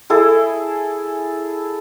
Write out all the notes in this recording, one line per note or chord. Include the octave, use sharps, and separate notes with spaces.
E4 G#4 A4